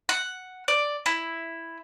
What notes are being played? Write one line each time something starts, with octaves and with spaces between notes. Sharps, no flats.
F#5
D5
E4